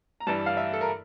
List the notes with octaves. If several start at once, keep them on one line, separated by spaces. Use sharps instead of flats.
A#5
G2 E3 G3 A5
F5
E5
A4
A#4